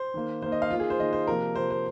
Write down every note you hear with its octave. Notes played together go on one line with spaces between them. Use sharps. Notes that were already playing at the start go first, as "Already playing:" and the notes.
Already playing: C5
D#3 A#3
D#3 A#3 C5
D#5
F5
D#3 A#3 F4
G#4
C5
D#3 A#3 D#5
C5
C3 F3 A#3 A#4
C3 F3 A#3 C5
C5